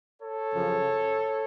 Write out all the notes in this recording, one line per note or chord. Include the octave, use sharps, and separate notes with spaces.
A4 C#5
F#2 C#3 F3